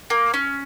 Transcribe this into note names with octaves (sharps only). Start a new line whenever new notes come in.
A#3
C#4